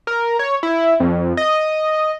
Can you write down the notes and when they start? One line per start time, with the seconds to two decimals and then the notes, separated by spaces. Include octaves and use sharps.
0.07 A#4
0.39 C#5
0.63 E4
1.00 F2
1.37 D#5